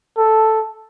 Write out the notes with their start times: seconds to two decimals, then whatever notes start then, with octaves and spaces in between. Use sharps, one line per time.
0.18 A4